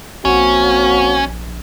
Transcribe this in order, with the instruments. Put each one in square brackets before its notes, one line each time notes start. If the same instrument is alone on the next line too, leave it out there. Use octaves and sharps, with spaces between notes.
[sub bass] A#1 [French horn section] A#3 C4 F#4 [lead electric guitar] C#4